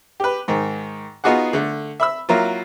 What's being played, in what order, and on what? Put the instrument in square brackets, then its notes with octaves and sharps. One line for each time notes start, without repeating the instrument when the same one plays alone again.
[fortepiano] G4 B4
G#2 D#3
B3 D#4 F4 F#4 G#4 F#5
D3 A3
E5 B5 E6
F#3 A#3 E4 F4